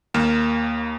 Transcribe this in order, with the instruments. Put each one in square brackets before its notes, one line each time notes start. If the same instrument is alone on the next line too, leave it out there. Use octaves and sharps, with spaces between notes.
[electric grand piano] D#2 A#3 F6 E7